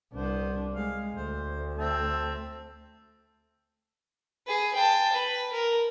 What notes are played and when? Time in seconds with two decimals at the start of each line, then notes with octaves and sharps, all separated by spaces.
0.13 C2 B3 D4 C5
0.74 G#3 F5
1.15 D2 C5
1.78 C4 E5 A5
4.46 G#4 B4
4.75 G5 A5
5.13 B4
5.53 A#4